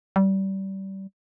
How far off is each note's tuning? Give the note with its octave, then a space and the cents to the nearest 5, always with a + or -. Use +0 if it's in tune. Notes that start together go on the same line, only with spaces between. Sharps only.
G3 -25